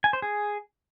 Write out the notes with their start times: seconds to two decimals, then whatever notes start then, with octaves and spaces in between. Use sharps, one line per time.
0.04 G#5
0.13 C5
0.22 G#4